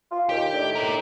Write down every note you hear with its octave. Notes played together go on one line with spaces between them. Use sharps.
F4
D#2 G4
A2 D#3 D4
A#4 D5